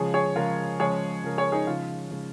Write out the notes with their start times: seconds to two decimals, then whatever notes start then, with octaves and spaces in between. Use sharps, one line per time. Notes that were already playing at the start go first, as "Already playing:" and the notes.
Already playing: C#3 F3 G#3 G#4 C#5
0.14 G#4 C#5
0.36 C#3 F3 G#3 F4 A#4
0.79 C#3 F3 G#3 G#4 C#5
1.23 C#3 F3 G#3 A#4
1.38 G#4 C#5
1.52 D#4 G#4
1.67 C#3 F3 G#3 F4
2.11 C#3 F3 G#3